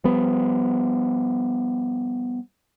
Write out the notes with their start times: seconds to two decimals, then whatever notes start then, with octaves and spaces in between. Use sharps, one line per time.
0.04 F3 G3 B3